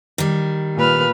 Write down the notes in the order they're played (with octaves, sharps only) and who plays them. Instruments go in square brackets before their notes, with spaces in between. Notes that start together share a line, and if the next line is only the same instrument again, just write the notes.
[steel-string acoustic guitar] D#3 G3
[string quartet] A#2 B4 F6